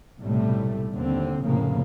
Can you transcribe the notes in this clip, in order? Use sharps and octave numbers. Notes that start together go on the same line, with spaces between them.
B1 A2 C3 G3 A3
D#2 D3 C4
F1 A2 C#3 A#3